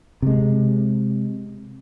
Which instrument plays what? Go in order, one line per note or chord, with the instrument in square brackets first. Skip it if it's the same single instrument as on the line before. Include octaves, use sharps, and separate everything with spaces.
[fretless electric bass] C3 G#3